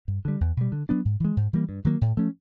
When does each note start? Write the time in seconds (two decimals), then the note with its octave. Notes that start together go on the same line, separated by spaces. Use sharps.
0.08 G2
0.25 D3 G3
0.41 E2
0.57 B2 G3
0.72 D3
0.89 F#3 B3 D4
1.05 G#2
1.20 E3 G#3
1.37 G#2
1.53 E3 G3 A#3
1.69 G2
1.85 D#3 F#3 A#3
2.01 A2
2.17 F3 A3 C#4